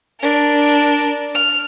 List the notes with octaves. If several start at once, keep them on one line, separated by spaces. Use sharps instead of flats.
D4 A#4
F6